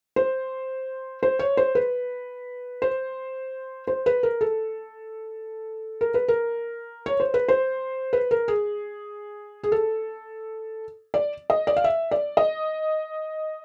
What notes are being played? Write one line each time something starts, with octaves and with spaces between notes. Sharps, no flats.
C5
C5
C#5
C5
B4
C5
C5
B4
A#4
A4
A#4
B4
A#4
C#5
C5
B4
C5
B4
A#4
G#4
G#4
A4
D5
D#5
D5
F5
E5
D5
D#5